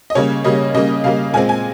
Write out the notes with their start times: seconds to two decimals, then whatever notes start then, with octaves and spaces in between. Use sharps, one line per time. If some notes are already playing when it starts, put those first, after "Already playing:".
0.10 D#5
0.15 C#3 G3 A#3 C#5
0.44 C#3 G3 A#3 D#5
0.74 C#3 G3 A#3 D#5
1.04 C#3 G3 A#3 F5
1.33 A#2 G#3 C4 G#5
1.49 G#5